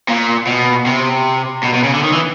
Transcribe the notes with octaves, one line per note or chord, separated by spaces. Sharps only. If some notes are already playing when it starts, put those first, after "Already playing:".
A#2
B2
C3
B2
B2
C#3
D3
D#3
E3